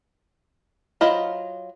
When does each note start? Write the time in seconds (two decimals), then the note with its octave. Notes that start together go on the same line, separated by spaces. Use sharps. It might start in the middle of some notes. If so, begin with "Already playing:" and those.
1.01 F#3 F4 C5 D#5 B5